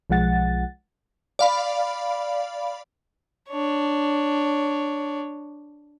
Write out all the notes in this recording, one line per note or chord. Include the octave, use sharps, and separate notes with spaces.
B1 F3 G#3 F#5 A6
D5 F5 B5
D4 C#5